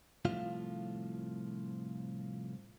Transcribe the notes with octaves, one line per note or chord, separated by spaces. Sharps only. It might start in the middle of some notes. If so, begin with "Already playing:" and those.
C2 A2 F3 F4 F5